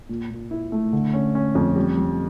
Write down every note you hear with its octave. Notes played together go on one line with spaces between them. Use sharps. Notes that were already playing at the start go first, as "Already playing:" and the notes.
A#2
A#2
E4
A3
D3
C#4
C#4
F2
G3
G3